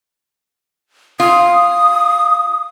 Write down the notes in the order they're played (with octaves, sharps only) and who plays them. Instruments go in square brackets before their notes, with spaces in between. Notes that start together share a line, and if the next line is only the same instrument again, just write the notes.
[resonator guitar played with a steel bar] F4 [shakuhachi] D#6